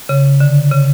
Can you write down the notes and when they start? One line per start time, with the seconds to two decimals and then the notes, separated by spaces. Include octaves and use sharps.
0.09 C#3
0.40 D3
0.72 C#3